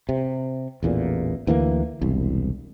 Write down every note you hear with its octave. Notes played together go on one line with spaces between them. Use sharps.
C3
A1 E2 A#2
D2 E3 F3 A#3
E1 C2